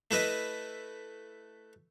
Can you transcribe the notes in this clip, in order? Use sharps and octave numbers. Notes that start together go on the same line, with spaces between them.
A3 E4 B4 D#5